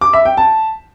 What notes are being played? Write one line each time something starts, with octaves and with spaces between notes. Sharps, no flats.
D6
E5
G5
A5